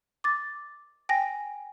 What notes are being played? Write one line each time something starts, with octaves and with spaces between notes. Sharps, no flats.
D6 A6
G5 G#5 A#6